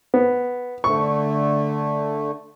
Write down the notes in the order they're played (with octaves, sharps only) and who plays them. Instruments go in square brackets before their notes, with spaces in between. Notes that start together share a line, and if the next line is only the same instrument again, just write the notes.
[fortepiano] B3
[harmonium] D3 A3 [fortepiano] C#6